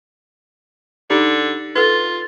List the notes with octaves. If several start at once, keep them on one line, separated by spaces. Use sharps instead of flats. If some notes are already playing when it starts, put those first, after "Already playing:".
D3 D#4 G4
F4 A4 B4